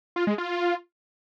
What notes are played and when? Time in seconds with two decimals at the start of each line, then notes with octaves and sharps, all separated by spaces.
0.16 F4
0.27 G#3
0.38 F4